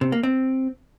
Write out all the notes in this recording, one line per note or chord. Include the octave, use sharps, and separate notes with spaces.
C3
A#3
C4